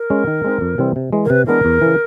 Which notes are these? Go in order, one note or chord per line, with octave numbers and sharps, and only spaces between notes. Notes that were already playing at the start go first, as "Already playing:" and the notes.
Already playing: A#4
G#3 C#4
D#3
G#3 C4 D#4
F2
C3 E3 G3 C4
C3
E3 G#3
A#4
C3 B4
E3 G#3 B3 D4 A#4
E2
C#3 E3